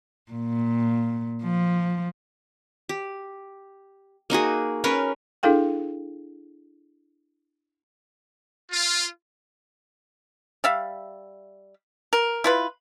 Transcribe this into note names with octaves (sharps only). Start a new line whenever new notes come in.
A#2
F3
G4
A#3 D#4 F#4 G#4
C#4 A#4 B4 C#5
D4 E4 G#4 A4 F5 G5
F4
G3 E5 F5
A#4
E4 F4 B4